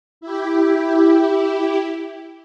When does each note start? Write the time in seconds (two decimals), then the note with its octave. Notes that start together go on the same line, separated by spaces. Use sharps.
0.21 E4 G4